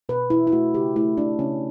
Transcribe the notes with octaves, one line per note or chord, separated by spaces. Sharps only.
B2 B4
B2 E4
E4
A3 F#4
C#3 G4
A3 E4
A3 D4
C#3 C#4